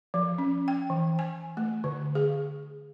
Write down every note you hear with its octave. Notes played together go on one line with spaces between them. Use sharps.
F3
C#4
G5
E3
G#5
A3
D3
G#4